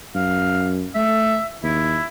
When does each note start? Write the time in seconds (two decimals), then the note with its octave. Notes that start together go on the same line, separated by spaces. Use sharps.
0.15 F#2 F5
0.95 A3 E5
1.63 D#2 E4